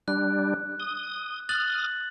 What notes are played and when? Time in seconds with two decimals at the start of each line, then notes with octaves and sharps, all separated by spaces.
0.08 G3 D4 F#6
0.80 D#6
1.49 D#6 F6 F#6 A6 F#7